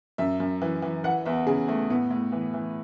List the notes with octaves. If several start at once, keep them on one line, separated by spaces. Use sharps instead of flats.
F#2 E5
F#2
E3
E3
E3 F#5
E2 E5
C#3 G#4
E2 A3
A2 B3
A2
E3
E3